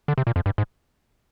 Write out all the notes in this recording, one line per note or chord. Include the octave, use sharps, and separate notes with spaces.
D3
C3
A#2
F2
G2
G#2